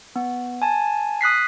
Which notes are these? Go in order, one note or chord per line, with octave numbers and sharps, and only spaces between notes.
B3
G#5 A5
D#6 F#6 B6 C7